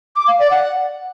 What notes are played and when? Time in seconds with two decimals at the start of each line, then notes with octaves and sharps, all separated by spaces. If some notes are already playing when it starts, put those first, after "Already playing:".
0.16 D6
0.28 F5
0.39 D5
0.51 F#5